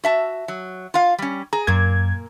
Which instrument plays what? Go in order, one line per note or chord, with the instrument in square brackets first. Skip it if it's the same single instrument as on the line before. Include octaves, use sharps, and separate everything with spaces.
[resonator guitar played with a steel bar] F#4 E5 A5
F#3
F4 F5
G3 C#4
[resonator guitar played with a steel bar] G#4 [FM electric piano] A#5
[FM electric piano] F#2 G#6 [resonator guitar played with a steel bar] A#2 A#3